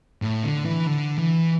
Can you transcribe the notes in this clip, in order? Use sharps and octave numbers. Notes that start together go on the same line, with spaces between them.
A2
D3
E3
D3
E3